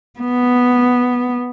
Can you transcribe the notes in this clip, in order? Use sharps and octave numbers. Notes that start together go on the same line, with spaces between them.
B3